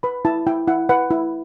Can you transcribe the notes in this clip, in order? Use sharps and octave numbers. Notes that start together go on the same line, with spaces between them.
B4 B5
E4 A5
E4 G5
E4 F#5
B4 F#5
E4